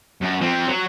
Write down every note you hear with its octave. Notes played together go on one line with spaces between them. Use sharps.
F#2
F3 C4
F#3